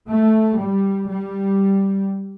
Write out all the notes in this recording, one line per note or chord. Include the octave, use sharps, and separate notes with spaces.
A3
G3
G3